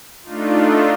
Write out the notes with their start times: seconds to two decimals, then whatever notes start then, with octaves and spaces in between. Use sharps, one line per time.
0.23 A3 D4 D#4 F4